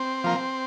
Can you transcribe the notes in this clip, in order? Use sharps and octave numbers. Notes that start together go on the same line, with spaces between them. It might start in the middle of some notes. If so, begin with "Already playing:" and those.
Already playing: C4
F3 A#3